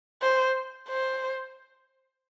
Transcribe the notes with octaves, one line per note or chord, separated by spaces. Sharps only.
C5
C5